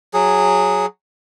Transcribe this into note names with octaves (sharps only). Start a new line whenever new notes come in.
F#3 G#4